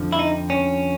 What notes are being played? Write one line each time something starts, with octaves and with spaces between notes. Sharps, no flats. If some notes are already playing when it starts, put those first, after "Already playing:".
Already playing: F2 D3 F3
E4
D#4
C#4